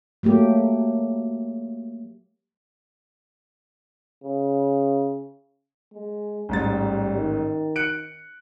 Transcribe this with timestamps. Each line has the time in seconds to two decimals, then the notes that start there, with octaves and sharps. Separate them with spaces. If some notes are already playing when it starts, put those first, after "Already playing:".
0.23 F#3 A3 A#3 G4
4.24 C#3
5.94 G#3
6.49 A1 G#2 G3 A6
7.16 D#3
7.76 F#6 C#7 D7